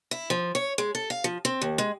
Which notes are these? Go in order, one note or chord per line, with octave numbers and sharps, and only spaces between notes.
E4
F3
C#5
G#3
A4
F5
F3
C4
D#2
G#3